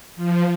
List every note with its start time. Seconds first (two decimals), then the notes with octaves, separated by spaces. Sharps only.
0.16 F3